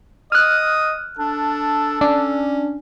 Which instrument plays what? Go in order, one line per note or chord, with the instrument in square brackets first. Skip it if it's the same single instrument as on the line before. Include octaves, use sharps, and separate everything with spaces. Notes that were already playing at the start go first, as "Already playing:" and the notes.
[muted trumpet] D#5 [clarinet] D#6 [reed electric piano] F6 F#6
[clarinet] D4 [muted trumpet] A4
[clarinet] C#4 [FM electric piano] D4